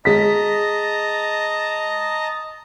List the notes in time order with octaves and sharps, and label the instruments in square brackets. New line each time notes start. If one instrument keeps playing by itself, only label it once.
[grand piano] G#3 B6 [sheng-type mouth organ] D#5 A5 A#5